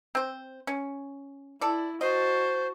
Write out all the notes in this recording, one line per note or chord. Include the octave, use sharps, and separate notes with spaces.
C4 C5
C#4
E4 A4 D5
F#4 C5 D#5 A5